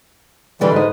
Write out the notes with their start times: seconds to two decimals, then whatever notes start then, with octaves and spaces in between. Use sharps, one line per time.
0.61 D3 E3 G3 G#3
0.74 G#2 B4 D#5